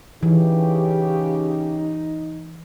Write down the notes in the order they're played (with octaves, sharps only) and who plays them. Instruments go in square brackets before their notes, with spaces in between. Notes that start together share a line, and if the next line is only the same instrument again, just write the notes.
[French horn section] C#3 G4 [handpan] E3 [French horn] D#4